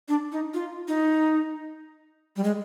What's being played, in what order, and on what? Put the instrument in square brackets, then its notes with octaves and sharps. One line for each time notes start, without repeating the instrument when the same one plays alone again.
[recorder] D4
D#4
F4
D#4
G3
G#3